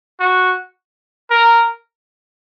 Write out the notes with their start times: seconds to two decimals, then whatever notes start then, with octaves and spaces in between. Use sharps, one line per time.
0.20 F#4
1.30 A#4